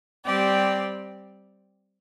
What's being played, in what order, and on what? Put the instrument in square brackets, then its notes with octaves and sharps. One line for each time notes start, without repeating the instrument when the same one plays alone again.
[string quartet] G3 C4 G4 D5